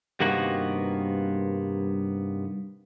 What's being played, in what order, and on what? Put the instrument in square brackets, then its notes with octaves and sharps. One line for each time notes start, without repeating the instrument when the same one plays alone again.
[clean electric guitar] G2 C3 D#3 A#3 B3 F#4